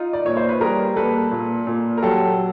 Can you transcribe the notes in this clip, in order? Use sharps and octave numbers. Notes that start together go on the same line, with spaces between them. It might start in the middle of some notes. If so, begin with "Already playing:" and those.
Already playing: D#4 F4
D5
A#2 C#5
C5
B4
G3 G#4 A#4
A#3 A4 B4
A#2
A#2
A#4
F#3 G4 A4